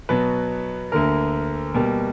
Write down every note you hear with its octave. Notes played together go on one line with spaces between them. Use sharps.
B2 F#3 B3 B4
D2 D3 A#3 A#4
B2 G3 A#3